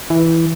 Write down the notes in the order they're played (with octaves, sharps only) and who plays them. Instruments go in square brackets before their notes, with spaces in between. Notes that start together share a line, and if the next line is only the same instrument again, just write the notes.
[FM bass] E3